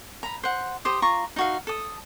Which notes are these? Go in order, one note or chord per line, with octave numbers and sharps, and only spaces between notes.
A#5 B5
C5 F#5
G4 C5 D#6
F4 A#5 C#6
D#4 F#4 F5
A4 D#6